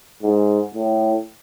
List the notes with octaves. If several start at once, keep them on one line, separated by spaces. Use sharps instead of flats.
G#2
A2